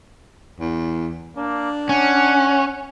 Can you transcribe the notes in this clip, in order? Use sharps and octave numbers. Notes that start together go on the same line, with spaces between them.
E2
A#3 D4
C#4 F#5